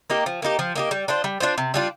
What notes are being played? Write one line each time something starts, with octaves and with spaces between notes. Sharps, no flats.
A#3 D#4 G4
F3
A#3 D#4 G4
F3
A#3 D#4 G4
G3
D4 F4 C5
G3
D4 F4 C5
C3
G3 D4 F4